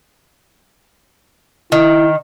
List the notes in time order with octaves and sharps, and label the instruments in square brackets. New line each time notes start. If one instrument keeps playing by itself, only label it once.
[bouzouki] D#3 [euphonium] E4